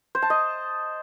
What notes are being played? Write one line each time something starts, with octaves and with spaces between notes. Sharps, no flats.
C5
A5
D#5